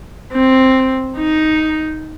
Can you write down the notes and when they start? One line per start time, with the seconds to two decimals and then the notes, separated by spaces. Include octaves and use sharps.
0.33 C4
1.18 D#4